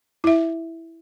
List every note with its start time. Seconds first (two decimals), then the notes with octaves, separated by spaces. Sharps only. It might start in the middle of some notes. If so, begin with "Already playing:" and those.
0.24 E4 E5